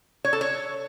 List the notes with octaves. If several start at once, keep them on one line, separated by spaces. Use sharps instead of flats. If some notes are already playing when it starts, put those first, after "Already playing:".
C#5
A4
C#5